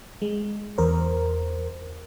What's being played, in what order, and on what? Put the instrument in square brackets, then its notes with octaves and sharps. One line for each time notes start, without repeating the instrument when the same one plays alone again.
[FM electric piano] G#3
E2 A#4 C5